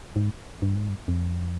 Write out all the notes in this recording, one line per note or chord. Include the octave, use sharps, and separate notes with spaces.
G#2
G2
G#2
G2
F2